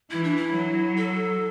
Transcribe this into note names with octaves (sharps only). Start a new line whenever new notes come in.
E3 E4
D4
E4
F#3
A4